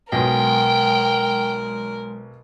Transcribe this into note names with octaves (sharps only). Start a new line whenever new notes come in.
B1 B2 F#3 G#3 A#4 G5 C6